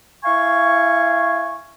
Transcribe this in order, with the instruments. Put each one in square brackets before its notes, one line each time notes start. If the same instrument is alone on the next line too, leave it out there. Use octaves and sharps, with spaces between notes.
[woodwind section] E4 F5 G#5 C#6